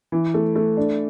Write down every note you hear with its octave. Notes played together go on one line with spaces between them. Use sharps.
E3
A3
A3
D4